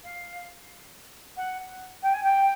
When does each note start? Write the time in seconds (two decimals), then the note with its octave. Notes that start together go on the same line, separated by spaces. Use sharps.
0.03 F5
1.36 F#5
2.02 G5
2.13 G#5
2.23 G5